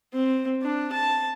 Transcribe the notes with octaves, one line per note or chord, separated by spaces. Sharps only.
C4
D4
A5